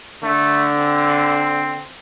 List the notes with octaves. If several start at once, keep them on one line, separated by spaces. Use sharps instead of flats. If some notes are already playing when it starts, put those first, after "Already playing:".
D3 A3
C4